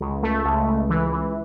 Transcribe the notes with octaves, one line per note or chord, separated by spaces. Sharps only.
C#2
A3
C#2
C#2
E3
E3